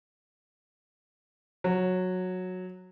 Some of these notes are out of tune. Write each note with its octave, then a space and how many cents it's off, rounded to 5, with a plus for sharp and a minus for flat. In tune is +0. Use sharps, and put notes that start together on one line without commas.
F#3 -10